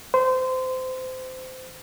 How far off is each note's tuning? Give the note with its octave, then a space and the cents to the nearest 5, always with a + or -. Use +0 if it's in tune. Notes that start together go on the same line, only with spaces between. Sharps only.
C5 -25